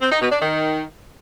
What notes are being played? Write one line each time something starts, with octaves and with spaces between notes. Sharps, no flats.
C4
D#4
B2
D4
D#3